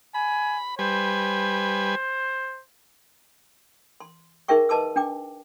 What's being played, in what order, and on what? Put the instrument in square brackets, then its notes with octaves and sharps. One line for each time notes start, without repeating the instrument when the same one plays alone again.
[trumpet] G#5 [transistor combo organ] B5
[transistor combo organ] G3 B4 G#5 [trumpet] C5
[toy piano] C6
D#4 G#4 A#4 E5 G5 C#6
B4 D#5 A5 C6 D6 E6
D4 G5 D6